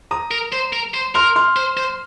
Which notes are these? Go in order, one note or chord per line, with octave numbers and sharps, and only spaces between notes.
A#5 D#6
A#4
C5
A#4
C5
A#4 C6 F6
C6 F6
C5
C5